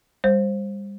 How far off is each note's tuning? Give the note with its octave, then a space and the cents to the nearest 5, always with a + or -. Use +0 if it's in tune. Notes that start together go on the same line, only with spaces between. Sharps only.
G3 +35 C5 +15